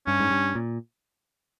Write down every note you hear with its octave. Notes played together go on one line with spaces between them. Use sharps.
G2 C#4
G#2
G2
A#2